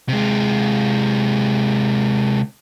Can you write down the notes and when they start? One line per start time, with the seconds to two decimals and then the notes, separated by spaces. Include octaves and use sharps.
0.09 C3 G#3